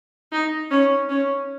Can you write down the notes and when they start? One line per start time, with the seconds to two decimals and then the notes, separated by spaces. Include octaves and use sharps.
0.32 D#4
0.71 C#4
1.09 C#4